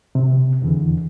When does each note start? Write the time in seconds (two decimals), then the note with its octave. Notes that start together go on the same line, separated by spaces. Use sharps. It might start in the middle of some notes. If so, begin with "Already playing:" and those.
0.15 C3
0.62 E2 D3 E3